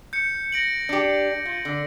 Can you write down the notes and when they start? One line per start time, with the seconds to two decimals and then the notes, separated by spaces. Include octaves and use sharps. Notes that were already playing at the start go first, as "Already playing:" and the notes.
0.13 G6 C#7
0.52 A#6 D7 F#7
0.89 D4 G4
1.45 F4
1.65 D3